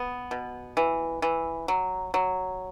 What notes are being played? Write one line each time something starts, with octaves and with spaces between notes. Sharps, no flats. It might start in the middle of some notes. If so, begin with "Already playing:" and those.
Already playing: B3
B2
E3
E3
F#3
F#3